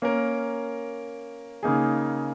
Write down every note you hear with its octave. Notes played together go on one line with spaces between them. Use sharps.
A#3 C#4 A#4
C#3 A#3 D#4 G#4